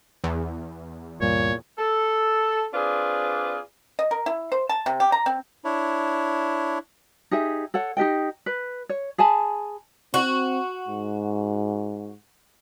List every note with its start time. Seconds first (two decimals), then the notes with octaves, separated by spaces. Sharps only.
0.24 E2
1.21 D2 G2 A#2 G3 C#5
1.79 A4
2.74 C4 D4 F4 G#4 B4 D5
3.99 D#5
4.11 A#4
4.26 E4
4.52 C5
4.69 A5
4.86 C3
5.00 G4
5.12 A#5
5.26 C4
5.65 D4 E4 C#5
7.31 D#4 G4 G#4 E5
7.74 A4 C#5 F#5
7.97 D#4 G4 D#5 G5
8.46 B4
8.89 C#5
9.18 G#4 G#5 A5 B5
10.14 C4 F#4
10.88 G#2